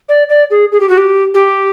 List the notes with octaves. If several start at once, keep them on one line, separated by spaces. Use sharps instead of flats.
D5
D5
G#4
G#4
G4
F#4
G4
G4